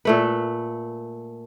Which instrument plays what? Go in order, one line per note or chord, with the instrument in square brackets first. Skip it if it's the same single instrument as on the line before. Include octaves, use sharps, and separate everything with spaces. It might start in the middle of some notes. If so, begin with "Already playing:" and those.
[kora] A#2 A3 B4